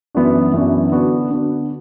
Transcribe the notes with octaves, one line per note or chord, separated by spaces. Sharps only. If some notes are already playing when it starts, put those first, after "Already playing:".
F#2 E3 B3 D4 F#4
F#2 E3 B3 D4 F#4
D3 B3 D4 F#4
D3 B3 D4 F#4